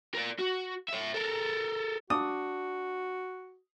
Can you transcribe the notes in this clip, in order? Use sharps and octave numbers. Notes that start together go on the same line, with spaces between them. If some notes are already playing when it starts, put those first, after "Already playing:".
A#4 D5
F#4
C#5 E5
A4 A#4
D4 F#4 D#6